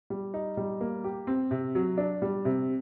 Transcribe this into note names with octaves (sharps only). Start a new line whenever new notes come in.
G3
D#4
G3
A#3
G4
C4
C3
F#3
D4
G3
C3